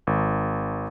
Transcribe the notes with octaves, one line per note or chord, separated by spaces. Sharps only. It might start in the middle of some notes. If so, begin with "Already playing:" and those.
G#1